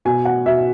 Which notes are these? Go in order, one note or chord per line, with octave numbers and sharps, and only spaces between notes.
B2 G#5
F#5
B2 E5